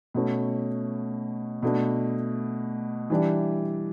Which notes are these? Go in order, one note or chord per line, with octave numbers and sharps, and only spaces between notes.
B2 A3 C#4
B2 A3 D4
E3 G3 D4